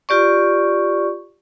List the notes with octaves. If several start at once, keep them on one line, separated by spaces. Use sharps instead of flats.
F4 G4 D5 C#6